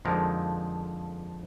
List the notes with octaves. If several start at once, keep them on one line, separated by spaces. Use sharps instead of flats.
F2 D3 F3 G#3 D#4 A#4